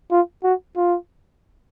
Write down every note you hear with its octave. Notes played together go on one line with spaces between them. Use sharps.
F4
F#4
F4